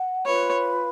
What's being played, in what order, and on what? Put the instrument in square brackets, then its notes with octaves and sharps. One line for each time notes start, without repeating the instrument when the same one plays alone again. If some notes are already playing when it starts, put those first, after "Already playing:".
Already playing: [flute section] F#5
[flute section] F4 B4 F5 B5 [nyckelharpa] C#5